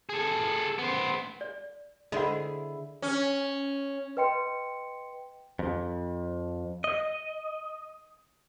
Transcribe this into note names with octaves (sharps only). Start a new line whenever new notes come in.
G#4 A4
B3 C5
D5
D3 E4 G#4 C5 D#5 F#5
C#4
B4 D#5 G5 C6 C#7
F2
D#5